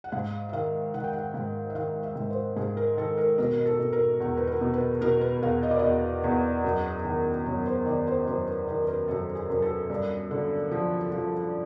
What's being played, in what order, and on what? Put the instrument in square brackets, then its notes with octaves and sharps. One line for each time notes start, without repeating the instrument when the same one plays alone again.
[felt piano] F#5
G#2 F5
E5
D#3 F5
D#3 F#5
G5
F#5
G#2 F5
E5
D#3 F5
E5
G#2
C5
G#2 G#4
A#4
D#3 A4
A#4
B2 A#4
A4
B2
A#4
E2
B4
A#4
B2
B4
B2 A#4
B4
E2 F5
D#5
D5
E2 D#5
E2
F#2
D#3
F#2 C#5
C5
D#3 D5
C5
F#2 C5
B4
D#3 A#4
B4
A#4
F#2 A4
G#4
F#2
A4
G2
D3
F3
F3